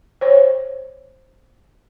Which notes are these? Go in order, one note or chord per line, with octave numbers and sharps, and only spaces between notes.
C5 C#5